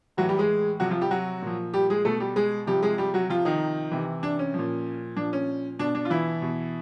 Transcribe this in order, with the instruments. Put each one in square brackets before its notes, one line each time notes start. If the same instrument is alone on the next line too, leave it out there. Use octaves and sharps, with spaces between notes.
[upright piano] A2 E3 F#3 F#4
G3 G4
G#3 G#4
C3 F3 F#3 F#4
F3 F4
G3 G4
F#3 F#4
A#2 F3
G3 G4
G#3 G#4
B2 A3 A4
G3 G4
G#3 G#4
C3 F3 G3 G4
G#3 G#4
G3 G4
F#3 F#4
C3 F3 F4
D#3 D#4
C3 E3
D4
C#4
F3
A#2
A#2 F3 D4
C#4
B2 D4
D4
F4
E3 E4
B2